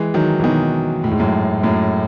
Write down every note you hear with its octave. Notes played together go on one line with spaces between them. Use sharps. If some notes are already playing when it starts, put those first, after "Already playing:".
Already playing: E3 G#3
D#3 F#3
E3
B2 D#3
A2
G#2
F#2 A2
F#2 A2